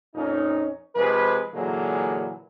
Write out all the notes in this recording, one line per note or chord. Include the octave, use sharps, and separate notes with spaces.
F2 A#2 C#4 D#4
C3 F3 G#3 B4
A#2 D3 E3 F#3 G#3 A#3